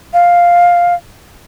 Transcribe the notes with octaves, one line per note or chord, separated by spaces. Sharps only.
F5